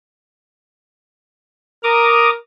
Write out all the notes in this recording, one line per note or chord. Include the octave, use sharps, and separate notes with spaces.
A#4 A#5 D6 D#6